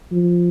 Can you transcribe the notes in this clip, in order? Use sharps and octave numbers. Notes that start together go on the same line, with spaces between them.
F3